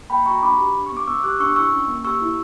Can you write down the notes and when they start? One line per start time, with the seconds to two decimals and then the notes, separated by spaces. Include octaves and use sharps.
0.10 A#3 G5 B5
0.26 F#4 A#5 C#6
0.42 D4 B5 D6
0.58 G4
0.75 D4
0.86 B3 C#6
0.97 D6
1.07 B3 C#6 E6
1.23 G4 D6 F#6
1.40 D4 C#6 E6
1.56 E4 C#6 E6
1.73 C#4
1.88 A#3
2.05 G4 C#6 E6
2.21 E4